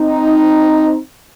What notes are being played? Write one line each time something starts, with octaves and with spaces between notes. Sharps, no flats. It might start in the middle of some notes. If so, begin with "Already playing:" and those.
Already playing: C4 D#4